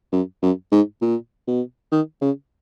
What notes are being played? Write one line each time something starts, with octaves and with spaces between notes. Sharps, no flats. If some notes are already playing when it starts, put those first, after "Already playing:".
F#2
F#2
G#2
A#2
B2
D#3
C#3